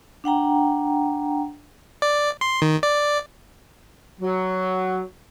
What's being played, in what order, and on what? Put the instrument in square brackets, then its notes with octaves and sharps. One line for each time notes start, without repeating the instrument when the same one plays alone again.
[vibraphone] D4 F#5 G5 A#5
[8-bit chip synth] D5
C6
D#3
D5
[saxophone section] F#3